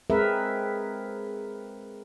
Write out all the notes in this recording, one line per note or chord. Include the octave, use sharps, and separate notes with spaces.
G#3 C4 G#4 A#4 B4 E5